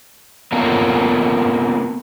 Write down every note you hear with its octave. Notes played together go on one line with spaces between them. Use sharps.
A#3 B3 C#4 F4 A4 A#4